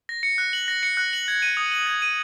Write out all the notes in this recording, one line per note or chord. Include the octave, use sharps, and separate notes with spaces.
A#6
C#7
F#6
F#7
A#6
C#7
F#6
F#7
G#6
D#7
D#6
F#7
G#6
D#7